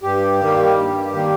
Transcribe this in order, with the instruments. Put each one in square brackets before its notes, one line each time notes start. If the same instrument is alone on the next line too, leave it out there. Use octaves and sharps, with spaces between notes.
[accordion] G2 G4
D#3 G3 A#3
G2
D#3 G3 A#3